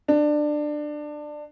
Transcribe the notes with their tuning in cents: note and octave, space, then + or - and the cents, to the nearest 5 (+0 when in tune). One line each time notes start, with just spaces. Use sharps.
D4 +20